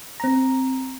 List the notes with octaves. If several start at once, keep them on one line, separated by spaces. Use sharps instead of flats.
C4 A#5